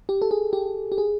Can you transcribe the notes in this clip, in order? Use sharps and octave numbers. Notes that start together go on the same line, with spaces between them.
G4
A4
G#4
G4
G4
G#4